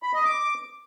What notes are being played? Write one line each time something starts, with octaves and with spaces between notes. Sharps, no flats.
B5
D#5
D6